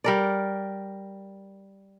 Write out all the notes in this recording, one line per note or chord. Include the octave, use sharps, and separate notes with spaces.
G3 A#4 D5